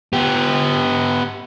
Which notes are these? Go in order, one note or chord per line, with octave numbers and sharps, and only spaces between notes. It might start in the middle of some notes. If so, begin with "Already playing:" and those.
B3 G4